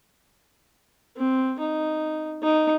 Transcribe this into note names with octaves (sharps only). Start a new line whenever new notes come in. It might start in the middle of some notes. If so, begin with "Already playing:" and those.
C4
D#4
D#4